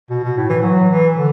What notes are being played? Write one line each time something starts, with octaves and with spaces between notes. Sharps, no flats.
B2
B2
A2
E3
F#3
E3
D3